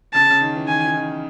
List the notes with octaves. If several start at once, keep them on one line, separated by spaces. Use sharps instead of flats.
C#3 A5
C#3
D#3
E3
D#3 G#5
E3
D#3